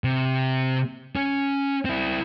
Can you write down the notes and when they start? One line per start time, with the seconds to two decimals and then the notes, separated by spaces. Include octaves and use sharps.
0.04 C3
1.16 C#4
1.85 C4 E4